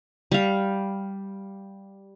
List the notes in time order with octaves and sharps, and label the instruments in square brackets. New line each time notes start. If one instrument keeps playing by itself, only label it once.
[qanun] G3 F5